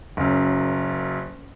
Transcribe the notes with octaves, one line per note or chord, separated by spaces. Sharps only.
F#1 F#2